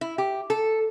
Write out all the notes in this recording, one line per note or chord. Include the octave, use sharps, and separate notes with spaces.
E4
G4
A4